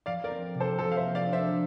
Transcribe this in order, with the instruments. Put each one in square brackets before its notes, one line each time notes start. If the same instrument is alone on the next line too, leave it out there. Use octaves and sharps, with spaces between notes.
[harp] F3 [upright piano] D5 F5
[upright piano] A#4 D5
[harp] C4
C3
[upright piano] A4 C5
[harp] F3 [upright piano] A4 C5
[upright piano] F5
C5 E5
[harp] A#3
[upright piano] D5 F5
[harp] D4
[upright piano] C5 E5
[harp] F3